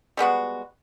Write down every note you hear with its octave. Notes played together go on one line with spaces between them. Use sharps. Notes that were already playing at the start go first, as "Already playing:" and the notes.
G3 G#3 B3 F#4